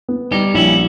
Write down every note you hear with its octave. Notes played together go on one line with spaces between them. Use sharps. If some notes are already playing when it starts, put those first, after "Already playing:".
B3
G3 D#4 G4
A#1 C#4 E4